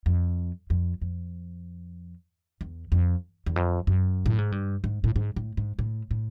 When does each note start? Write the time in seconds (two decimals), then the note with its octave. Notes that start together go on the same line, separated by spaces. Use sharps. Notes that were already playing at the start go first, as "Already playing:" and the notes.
0.06 F2
0.70 F2
1.02 F2
2.61 E2
2.92 F2
3.46 E2
3.56 F2
3.87 F#2
4.26 A2
4.38 G#2
4.52 G2
4.84 G#2
5.04 A2
5.16 G#2
5.36 A2
5.57 G#2
5.79 A2
6.11 A2